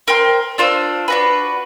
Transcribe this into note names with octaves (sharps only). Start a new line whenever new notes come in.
A#4 C5 G5 C6
D4 F4 C5 E6
D4 F#4 B4